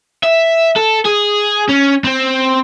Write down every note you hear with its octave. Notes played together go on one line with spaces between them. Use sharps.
E5
A4
G#4
C#4
C4